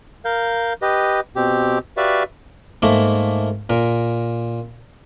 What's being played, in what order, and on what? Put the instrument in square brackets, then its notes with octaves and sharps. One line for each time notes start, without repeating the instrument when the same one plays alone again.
[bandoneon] A#4 F5 G6
G4 B4 D#5
B2 C4 G4
F#4 G4 B4 D5 E5 F5
[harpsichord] G#2 A3 A#3
A#2 A#4